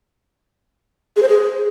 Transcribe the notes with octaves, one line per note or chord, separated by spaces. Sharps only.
G#4
C5
G#4